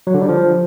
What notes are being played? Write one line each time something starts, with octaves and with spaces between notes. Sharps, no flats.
F#3
D3
G3
F3